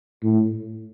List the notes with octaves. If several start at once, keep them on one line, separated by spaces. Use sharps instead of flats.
A2